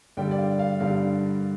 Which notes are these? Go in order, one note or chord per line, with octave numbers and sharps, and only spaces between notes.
G2 D3 G3 G5
D5
F5
F5
G2 D3 G3 F5